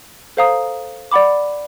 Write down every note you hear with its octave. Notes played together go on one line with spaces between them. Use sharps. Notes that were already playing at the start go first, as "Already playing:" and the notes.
A4 C5 F5 A#5 D#6
D5 F#5 B5 D6